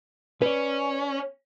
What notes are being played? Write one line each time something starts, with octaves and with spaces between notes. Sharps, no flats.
C#4 B4 D5